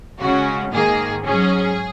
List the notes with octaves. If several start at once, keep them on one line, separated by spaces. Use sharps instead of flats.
C#3 G#3 C#4 F#4
G#2 D#3 A#3 G#4
G#2 F#3 C#4 G#4